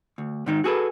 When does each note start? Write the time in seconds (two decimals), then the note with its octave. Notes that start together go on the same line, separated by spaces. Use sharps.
0.18 D2
0.46 G#2 D#3 D#4
0.64 F#4 G#4 A4 B4